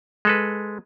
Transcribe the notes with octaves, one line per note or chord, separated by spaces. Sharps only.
G#3 A4 B4